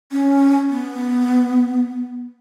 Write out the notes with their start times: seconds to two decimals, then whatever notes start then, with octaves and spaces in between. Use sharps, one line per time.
0.12 C#4
0.70 B3